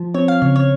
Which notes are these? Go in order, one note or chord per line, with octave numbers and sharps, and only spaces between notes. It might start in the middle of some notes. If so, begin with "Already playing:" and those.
Already playing: F3
C4 C#5
F5
C#3 C#5
C#5